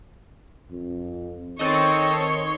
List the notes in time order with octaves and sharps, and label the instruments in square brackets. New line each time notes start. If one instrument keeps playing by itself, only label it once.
[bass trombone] F2
[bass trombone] D#3 [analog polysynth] C4 A4 D#5 [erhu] C#5
[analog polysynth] C6